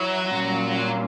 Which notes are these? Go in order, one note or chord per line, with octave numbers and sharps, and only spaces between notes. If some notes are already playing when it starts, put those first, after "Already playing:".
Already playing: E3 F#3 E4
A#2 G3 A#3 C#4 F4